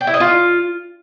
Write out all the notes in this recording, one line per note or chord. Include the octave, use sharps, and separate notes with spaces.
G5
E4
D#5
F4